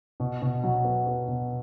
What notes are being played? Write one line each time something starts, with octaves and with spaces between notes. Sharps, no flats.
B2
B2
F#3
B3
B3
B2